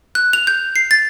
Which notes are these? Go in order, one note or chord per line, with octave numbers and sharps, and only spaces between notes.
F#6
F7
G6
C7
A6